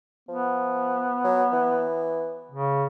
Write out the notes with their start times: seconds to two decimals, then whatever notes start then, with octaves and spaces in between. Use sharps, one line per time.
0.29 F3 B3
1.24 F#3
1.53 E3
2.52 C#3